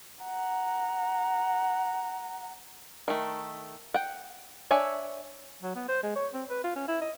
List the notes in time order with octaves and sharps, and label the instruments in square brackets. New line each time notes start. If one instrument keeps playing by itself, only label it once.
[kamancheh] F#5 A#5
[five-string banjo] D#3 A3
F#5 G5
D4 C#5 E5 G#5
[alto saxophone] F#3
B3
C5
G#3
C#5
C4
B4
F4
C#4
E4
D#5